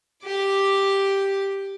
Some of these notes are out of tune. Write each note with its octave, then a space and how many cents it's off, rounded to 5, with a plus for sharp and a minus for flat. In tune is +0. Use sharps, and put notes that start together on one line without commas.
G4 +0 D6 +0